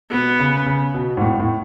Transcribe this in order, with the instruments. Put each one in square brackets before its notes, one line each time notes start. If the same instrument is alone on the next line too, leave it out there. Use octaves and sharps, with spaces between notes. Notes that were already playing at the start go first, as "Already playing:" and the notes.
[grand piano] B2 [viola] B3
[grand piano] C#3
C#3
B2
G#2
A2
A2